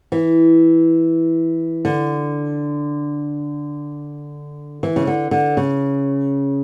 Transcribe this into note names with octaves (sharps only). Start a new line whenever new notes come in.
E3
D3
E3
C#3
D3
D3
C#3